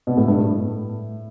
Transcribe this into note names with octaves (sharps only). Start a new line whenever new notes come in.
B2
A2
G2
A2